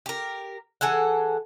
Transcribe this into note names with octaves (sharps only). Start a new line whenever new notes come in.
G4 A#4
E3 G#4 A4 F#5